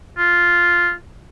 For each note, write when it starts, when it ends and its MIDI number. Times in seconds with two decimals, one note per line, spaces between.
0.17 0.92 65